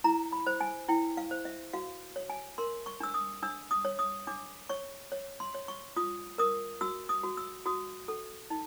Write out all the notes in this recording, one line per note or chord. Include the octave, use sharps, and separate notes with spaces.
E4 A#5
B5
C5
G#5
E4 G5
F5
C5
E5
F#4 F5
C#5
G#5
A#4 C6
C#6
D4 E6
D#6
D4 E6
D#6
C#5
D#6
D4 D6
C#5 C#6
C#5
C6
C#5
C#6
F4 D#6
A#4 D#6
F#4 E6
D#6
F#4
E6
F#4 D#6
A4
D#4